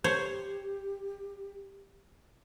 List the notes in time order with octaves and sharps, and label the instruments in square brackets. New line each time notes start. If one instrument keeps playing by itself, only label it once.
[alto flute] G4 [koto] C5 C#5